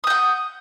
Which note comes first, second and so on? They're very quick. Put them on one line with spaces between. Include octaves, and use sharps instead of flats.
D#6 G6 F#5